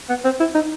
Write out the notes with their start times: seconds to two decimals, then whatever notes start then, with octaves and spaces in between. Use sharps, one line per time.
0.09 B3
0.25 C4
0.40 E4
0.55 D#4